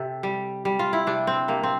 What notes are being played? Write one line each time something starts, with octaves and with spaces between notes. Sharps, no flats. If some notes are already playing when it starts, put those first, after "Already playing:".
Already playing: C3 G4 A4
G3
G3
F4
E4
C3 D4
C4
C3 A#3
C4